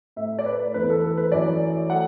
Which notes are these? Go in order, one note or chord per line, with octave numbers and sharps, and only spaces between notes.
A2 A3 E5
D5
B4
E2 E3 A3 B4
A4
A4
B4
F#2 E3 A3 D5
F#3 A3 F#5